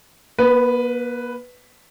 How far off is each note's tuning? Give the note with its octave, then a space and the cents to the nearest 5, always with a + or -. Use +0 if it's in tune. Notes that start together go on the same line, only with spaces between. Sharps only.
A#3 +45 B4 +5